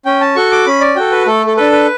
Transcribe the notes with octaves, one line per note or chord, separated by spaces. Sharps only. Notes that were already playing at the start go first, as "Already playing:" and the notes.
C#4 G5
A5
F#4 A4 C#6
D6
C#4 B5
D5
F#4 A4 G5
B4
A3 A4
A4
D4 A4 B4
B4